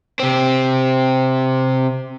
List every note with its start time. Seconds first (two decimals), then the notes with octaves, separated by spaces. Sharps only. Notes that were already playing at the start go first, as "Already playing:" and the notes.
0.20 C3 C4